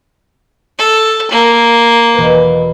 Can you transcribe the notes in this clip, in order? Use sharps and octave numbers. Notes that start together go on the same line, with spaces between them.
A4
A#3
E1 B4